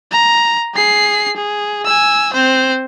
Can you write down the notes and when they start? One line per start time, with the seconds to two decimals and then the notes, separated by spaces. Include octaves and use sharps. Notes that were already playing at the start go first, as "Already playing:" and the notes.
0.12 A#5
0.74 G#4 C7
1.36 G#4
1.86 G#5 E6
2.33 C4 C5